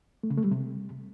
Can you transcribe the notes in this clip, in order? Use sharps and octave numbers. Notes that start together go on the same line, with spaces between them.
A3
C#3
A3
G3
C3